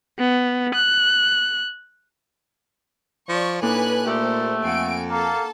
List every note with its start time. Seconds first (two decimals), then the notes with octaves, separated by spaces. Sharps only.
0.19 B3
0.75 F#6
3.29 F3 D5 C#6
3.62 A2 A#3 D4 D#4 B4 G#5 F#6
4.06 A#2 A3 G4 C5
4.64 F2 F5 F#5 G#5 D7
5.10 A#3 A4 A5